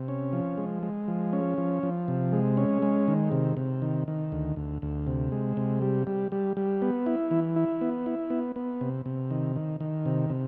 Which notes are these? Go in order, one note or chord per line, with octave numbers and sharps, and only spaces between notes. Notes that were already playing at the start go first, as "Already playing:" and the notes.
Already playing: C3
C#4
F3
G#3
G#3
F3
C#4
F3
F3
C3
G#3
C#4
G#3
D#3
C3
C3
D#3
D#3
D2
D2
D2
C3
G#3
C3
G3
G3
G3
G3
B3
E4
E3
E4
B3
E4
B3
B3
C3
C3
D#3
D#3
D#3
C3
C3